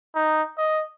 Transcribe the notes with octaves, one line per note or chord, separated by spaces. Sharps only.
D#4
D#5